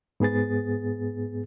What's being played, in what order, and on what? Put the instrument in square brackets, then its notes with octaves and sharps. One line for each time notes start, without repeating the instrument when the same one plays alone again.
[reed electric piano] G#2 B3 G#4 A6